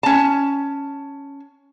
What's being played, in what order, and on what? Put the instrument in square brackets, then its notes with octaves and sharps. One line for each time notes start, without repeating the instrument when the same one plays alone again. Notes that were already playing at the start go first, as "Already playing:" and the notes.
[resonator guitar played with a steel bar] C#4 A5